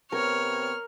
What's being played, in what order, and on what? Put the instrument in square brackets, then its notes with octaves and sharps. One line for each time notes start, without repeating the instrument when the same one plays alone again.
[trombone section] C3 B3 C4 [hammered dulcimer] A#4 [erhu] C#5 [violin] F6